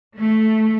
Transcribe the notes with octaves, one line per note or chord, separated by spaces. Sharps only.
A3